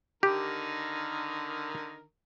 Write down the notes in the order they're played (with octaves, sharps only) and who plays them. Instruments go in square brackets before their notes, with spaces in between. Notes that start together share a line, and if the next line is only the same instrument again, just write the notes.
[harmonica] D3 D#3 A#4 [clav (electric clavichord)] G4